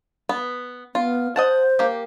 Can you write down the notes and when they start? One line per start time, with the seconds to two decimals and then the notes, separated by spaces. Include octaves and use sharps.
0.29 B3
0.95 B3 F4
1.36 C5 D#5 F#5 A5
1.79 A#3 G4